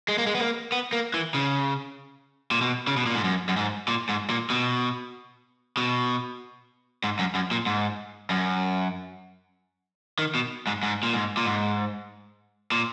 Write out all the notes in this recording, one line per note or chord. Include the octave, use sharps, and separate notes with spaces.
G#3
A#3
G#3
B3
A#3
B3
A#3
E3
C#3
A#2
B2
C#3
B2
A#2
G#2
F#2
F#2
G#2
A#2
G#2
A#2
B2
B2
G#2
F#2
F#2
A#2
G#2
F#2
D#3
B2
G#2
G#2
A#2
G#2
A#2
G#2
A#2